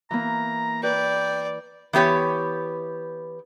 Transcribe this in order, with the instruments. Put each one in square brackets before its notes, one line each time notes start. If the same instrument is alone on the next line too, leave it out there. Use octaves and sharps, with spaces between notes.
[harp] E3 A#3 [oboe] A#5
[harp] B4 [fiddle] D5 [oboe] G5
[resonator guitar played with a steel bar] E3 B3 G4 C#5